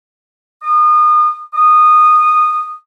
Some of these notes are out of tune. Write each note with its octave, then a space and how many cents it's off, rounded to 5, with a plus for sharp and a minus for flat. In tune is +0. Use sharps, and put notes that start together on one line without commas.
D#6 -35
D#6 -15